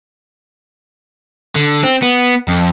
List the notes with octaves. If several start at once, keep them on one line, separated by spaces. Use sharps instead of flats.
D3
C4
B3
F2